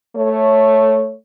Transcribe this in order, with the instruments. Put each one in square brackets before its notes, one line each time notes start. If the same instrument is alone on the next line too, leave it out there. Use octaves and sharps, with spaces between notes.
[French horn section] A3 C#5